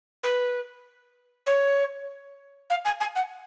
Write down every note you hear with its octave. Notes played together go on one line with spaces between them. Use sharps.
B4
C#5
F5
G#5
G#5
F#5